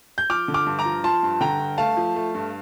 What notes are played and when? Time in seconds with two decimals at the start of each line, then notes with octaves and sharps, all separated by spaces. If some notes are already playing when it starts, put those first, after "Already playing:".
0.18 G6
0.30 F3 D6 F6
0.48 D3
0.54 D6 F6
0.66 G2
0.79 A#5 D6
0.85 F3
1.04 F3 A5 C6
1.23 G2
1.41 D3 G5 A#5
1.59 G2
1.78 A3 F5 A5
1.97 F3
2.16 A3
2.35 G2